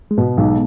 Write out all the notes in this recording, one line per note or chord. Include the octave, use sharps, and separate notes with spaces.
G#3
B2 B3
B1 G#3